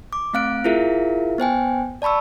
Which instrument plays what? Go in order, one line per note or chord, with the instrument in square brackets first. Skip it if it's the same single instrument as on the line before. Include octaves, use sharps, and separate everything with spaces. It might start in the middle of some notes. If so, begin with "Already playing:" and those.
[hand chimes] D6
A3 C4 F5 F#6 D7
E4 F4 G#4 A#4 E5 F5
B3 C5 G5 G#5
D5 A5 B5 C#6 E6